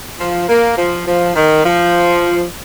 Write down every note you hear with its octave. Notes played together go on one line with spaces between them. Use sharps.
F3
A#3
F3
F3
D#3
F3